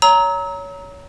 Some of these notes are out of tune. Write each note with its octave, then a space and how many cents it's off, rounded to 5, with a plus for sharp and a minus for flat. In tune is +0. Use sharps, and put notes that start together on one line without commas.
C#5 +20 A#5 +0 E6 -40